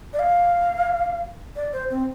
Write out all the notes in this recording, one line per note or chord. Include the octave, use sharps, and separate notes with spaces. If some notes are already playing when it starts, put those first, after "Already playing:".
D5
F5
D5
C5
C4